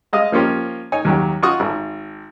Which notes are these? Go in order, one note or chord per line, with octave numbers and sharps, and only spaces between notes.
G#3 D#5 F5 D#6
F3 A#3 C#4 F4 G4
D#4 C#5 G#5
D#2 F#3 G4
F4 F#4 C#6 D#6
G#1